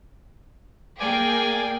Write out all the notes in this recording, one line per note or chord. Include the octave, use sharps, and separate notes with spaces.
A#3 G#4 D5 G5 G#5